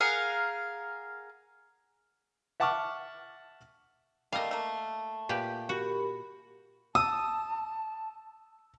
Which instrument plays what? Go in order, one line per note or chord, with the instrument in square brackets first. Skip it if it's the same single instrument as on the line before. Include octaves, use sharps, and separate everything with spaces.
[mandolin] G#4 A#4 F5 F#5
[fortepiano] E5 F#5 A5 C#6 D6 F6
[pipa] G3 A3 A#3 [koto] D#5 F5
[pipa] A3 A#3
[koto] A#2 G4 B4
[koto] F#4 [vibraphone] G4 A#4 B5
[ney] A5 [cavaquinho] D#6 [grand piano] E6